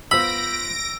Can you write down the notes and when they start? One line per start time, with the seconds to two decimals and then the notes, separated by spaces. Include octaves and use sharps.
0.11 B3 F4 C5 B5 E6 A#6 D7